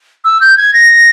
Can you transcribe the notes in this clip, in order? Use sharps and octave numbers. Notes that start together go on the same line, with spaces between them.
E6
G6
G#6
A#6